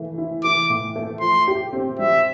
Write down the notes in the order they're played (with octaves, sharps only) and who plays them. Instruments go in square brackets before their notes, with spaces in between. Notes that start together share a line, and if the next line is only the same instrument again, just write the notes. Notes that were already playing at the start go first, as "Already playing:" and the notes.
Already playing: [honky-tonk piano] E3 A3
E4
[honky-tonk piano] E3 [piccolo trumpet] D6
[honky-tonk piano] A2
A3
[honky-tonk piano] F3 [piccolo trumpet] C6
[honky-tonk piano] G4
C4
[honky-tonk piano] G3 [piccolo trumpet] E5